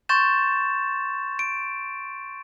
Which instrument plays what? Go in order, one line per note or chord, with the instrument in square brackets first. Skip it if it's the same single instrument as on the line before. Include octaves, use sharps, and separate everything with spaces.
[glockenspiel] C6 C#6 G6 A6 E7
D7